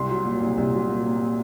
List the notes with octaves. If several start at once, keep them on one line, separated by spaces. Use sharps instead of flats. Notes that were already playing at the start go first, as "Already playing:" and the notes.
Already playing: C2 C6
F#3
A#2
C2
C2
F#3
A#2